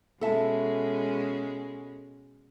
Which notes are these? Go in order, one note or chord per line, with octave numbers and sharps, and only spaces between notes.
B2 G#3 C#4 A4 E5 A5